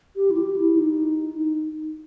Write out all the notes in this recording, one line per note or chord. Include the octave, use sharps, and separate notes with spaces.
G4
E4
G4
E4
D#4
D#4